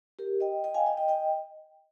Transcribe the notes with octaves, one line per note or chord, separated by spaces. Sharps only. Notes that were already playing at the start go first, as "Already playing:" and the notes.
G4 A#4
D#5 G5
D#5 G5
F5 G#5
D#5 G5
D#5 G5
D#5 G5